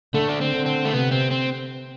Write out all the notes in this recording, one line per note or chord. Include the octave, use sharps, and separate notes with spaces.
D3 A3
D4
C4
D3
C4
A3
C3 B3
C4
C4